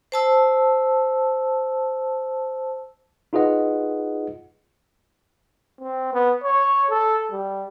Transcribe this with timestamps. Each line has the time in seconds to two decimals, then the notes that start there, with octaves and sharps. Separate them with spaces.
0.12 C5 A5 E6
3.33 D#4 F4 G#4 B4 D#5 F#5
5.80 C4
6.13 B3
6.44 C#5
6.90 A4
7.32 G3